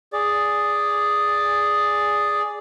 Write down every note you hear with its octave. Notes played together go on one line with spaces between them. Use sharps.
G#4 D5